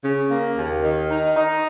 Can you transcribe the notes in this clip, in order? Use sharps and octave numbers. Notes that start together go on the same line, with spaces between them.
C#3
A#3
D#2
D#3
D#4
D#4